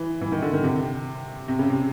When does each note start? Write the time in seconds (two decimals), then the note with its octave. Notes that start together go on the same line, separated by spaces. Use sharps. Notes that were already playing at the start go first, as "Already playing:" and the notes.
Already playing: E3
0.21 E3
0.32 D#3
0.42 D3
0.53 D#3
0.64 C3
1.48 C3
1.59 C#3
1.70 C3